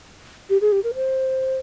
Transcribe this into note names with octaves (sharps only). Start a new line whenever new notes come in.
G4
G#4
G4
A#4
C5